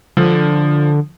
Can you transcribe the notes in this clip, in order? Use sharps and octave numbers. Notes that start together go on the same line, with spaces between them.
D3 F3